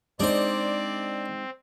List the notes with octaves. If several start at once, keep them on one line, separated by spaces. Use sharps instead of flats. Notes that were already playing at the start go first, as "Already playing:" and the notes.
G#3 C4 D4 D#4 C5 D5